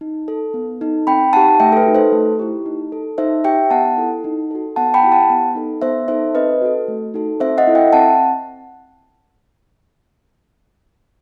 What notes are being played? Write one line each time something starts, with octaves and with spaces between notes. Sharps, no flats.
D#4
A4
B3
D#4 A4
C4 G5 B5
D#4 G4 F#5 A5
A3 E5 G5
A4
B4
D#4 F#4
A4 C5
A3
E4 G4
D#4
A4
D#4 C5 E5
G4 E5 G5
B3 F#5 A5
E4 A4
D#4
F#4 A4
B3 F#5 A5
G5 B5
E4 G4
F#5 A5
B3
D#4 A4
B3 C5 E5
D#4 A4 C5 E5
C4 B4 D#5
F#4 A4
A3
D#4 F#4 A4
C4 C5 E5
D#5 F#5
E4 A4
E5 G5
C4 F#5 A5